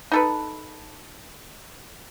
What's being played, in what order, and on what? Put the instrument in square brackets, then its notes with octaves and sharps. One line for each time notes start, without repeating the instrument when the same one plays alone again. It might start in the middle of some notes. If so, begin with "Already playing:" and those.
[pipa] D#4 A4 B4